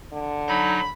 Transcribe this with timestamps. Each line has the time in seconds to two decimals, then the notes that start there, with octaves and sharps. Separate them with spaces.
0.13 D3
0.48 F#3 D#4 B5